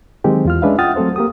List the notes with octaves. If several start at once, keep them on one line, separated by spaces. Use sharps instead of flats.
D#3 F#3 G#3 C4 G4
E2 F4 F6
G#3 C#4 D4 B4 E5 F5
F4 F#5 G5 D#6 F6 A6
F#3 A3 C4 A4 C5
A#3 G4 D#6